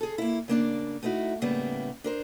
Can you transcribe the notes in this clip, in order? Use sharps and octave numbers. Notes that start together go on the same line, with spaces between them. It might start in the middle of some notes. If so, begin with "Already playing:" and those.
G#4 A4
A#3 E4
C#3 A#3 D4 D5
A3 B3 D#4 E4 F#4
A2 C#3 G3 A#3 B3
D4 A#4 C5